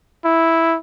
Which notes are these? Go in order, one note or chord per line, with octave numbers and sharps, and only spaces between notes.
E4